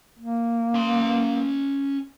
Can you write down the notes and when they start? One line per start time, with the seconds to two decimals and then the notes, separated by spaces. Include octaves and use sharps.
0.19 A#3
0.74 C#4 C6